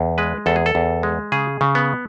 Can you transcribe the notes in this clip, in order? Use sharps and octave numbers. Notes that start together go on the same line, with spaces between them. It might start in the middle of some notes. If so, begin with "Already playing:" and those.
Already playing: E2
G#3 B4
E2 A4
G#4
A4
E2
G#3
C#3 G#4
C#3
B3